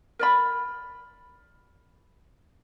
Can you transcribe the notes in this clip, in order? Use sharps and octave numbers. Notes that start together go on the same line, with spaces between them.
A#4 D5 B5